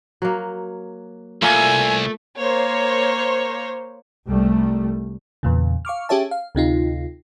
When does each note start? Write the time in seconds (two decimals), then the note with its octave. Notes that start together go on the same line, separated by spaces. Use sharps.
0.22 F#3 A#3
1.42 C2 A3 A#3 F4 G#5
2.37 A#3 C5 C#5
4.29 C2 G3 A3
5.43 E2 A#2 C#3
5.85 F5 C#6 D6 F6
6.09 C#4 G4 G#4 C#5 E5 A5
6.31 F5
6.55 D2 C3 D#4 F4